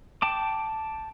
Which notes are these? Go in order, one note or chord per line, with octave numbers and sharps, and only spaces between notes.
G5 A5 D6